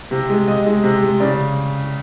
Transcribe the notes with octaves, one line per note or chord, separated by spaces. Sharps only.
C3
G#3
C3 D#5
G#3
C3
G#3
C#3 D5